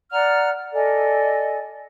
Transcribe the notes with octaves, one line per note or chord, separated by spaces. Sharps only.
D5 F#5 A#5 F6
A4 D5 D#5 G#5